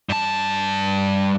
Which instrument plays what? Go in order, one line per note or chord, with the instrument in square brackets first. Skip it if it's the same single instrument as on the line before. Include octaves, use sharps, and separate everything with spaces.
[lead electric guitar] G2 A5